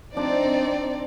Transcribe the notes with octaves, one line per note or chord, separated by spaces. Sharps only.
F3 C4 D4 D#4 C5 D5